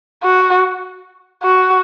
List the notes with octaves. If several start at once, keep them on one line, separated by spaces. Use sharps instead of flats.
F#4
F#4